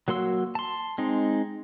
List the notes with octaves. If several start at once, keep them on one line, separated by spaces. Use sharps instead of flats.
F#3 A#3 F#4 C6 E6
A5 C6
G#3 C4 D#4